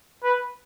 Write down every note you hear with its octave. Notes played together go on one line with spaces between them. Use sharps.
B4